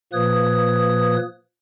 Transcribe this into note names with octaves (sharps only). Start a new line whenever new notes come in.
A#2 F3 A#3 B4 D#6 G#6